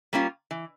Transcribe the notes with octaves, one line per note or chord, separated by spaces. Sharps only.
G3 A#3 C#4 F4
E3